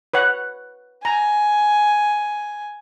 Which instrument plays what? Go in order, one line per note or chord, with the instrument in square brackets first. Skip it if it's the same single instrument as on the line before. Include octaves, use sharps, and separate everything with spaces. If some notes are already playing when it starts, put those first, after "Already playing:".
[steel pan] B4 C#5 F#5
[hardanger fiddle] G#5 [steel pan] A#5